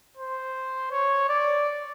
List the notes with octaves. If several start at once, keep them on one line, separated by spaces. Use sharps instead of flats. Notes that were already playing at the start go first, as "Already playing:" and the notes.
C5
C#5
D5